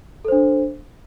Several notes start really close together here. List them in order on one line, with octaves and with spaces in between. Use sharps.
A4 C5 D4